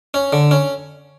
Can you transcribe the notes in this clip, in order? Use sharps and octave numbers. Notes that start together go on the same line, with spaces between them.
C#4
D3
C#4